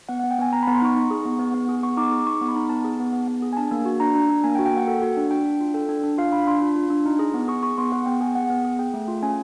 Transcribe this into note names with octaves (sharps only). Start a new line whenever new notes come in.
B3 F#5
B3 F#5
G5
B3 G#5
B3 A#5
B5
B3
C6
D#4 C#6
D#4
G#4
B3
B3
B3
G#4
B3 C#6
D#4 D6
G#4 D6
D#4 C#6
B3
B5
D#4
B3 A5
G#4
B3
B3
B3
G#4
G#5
D4 A5
A#3
F#4
D4 A#5
D4
D4
A#3 G#5
G5
F#4
G5
A#3 F#5
A4
F#4
D4
D4 G5
D4
F4
A4 G5
D4
D4
F4 F5
D4 B5
D4 C6
F4
F4
D4
D#4
G#4
B3
G#4 C#6
G#4 C#6
B3 C6
G#4 F#5
B3 G5
G#4 G#5
B3 F#5
B3
G#4
G#4 G5
A3
F4
C#4 G#5